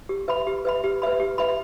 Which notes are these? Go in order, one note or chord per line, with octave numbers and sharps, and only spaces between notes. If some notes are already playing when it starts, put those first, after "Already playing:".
G4
B4 E5 B5
G4
B4 E5 B5
G4
B4 E5 B5
G4
B4 E5 B5